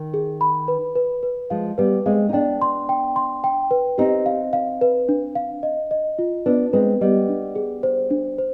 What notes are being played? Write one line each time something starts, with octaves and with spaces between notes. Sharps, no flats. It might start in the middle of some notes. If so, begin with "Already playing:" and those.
Already playing: D#3
G#4
B5
B4
B4
B4
F3 G#3 F5
G3 B3 B4
G#3 C4 F5
D#4
B3 D4 G5
C6
G5
C6
G5
B4
C4 D#4 G4
F5
F5
B4
D4
F5
D#5
D#5
F4
B3 D4 B4
G#3 C4 B4
G3 B3 D#5
D4
G#4
C5
D4
C5